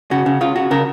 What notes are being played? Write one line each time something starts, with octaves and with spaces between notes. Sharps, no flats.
C#3 F#4
C#3
C#3 F4
C#3 F#4
C#3 A#4